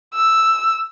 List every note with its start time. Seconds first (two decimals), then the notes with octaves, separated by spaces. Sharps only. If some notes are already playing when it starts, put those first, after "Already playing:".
0.14 E6